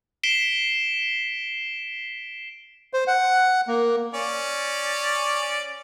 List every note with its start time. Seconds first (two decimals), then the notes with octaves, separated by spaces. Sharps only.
0.23 B6 C7 D7 E7 G7
2.93 C5
3.07 F#5
3.68 A#3
4.14 C#4 D5